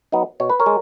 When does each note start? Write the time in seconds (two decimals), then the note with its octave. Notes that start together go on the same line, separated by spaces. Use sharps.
0.12 F#3 B3 D#4
0.40 B2 C#5
0.50 B4
0.60 A#4 C#5
0.66 G#3